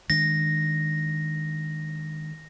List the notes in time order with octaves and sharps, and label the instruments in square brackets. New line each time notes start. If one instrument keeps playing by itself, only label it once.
[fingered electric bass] D#3 G#3 D4 [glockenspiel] A#6